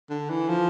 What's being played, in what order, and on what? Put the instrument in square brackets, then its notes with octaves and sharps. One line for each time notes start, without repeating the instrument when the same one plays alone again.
[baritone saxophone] D3
E3
F3